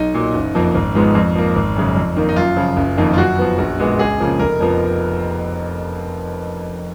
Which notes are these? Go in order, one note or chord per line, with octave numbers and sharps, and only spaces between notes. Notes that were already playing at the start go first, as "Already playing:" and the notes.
Already playing: B1 D#4
A#2 F#3
F#1
F2 F3 A#3
G#1
G#2 F3 G#3 B3
F2
F3 A#3
G#1
F#2 C#3
F2
D#3 A#3
D#4
F#2 F4
C#3 F3
F#1
F2 D#3 A#3
F4
F#2 F#4
F3 B3
A#1
A#2 G#3 B3
C#2 G#4
C#3 F3 A#3
F1 A#4
F2 F3 B3